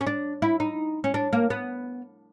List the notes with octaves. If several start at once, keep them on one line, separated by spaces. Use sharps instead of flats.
C#4
D4
E4
D#4
C#4
D4
A#3
B3